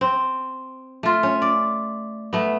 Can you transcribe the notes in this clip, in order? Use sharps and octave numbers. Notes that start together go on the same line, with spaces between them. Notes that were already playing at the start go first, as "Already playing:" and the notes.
C4
A3 F4
C#4
D5
A3 B3